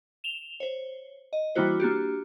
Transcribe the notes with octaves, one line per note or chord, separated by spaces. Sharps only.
E7 F7 G7
C5 C#5
D#5
E3 G3 A#3 E4 F#4 C5
A#3 D4 F#4 G4